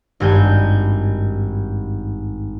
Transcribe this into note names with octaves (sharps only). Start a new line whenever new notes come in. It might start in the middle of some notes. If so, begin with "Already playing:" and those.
G#1 G2 G#5 G6